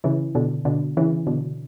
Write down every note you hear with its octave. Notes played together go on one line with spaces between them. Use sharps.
C#3 E3
B2 D3
B2 D3
C#3 E3
B2 D3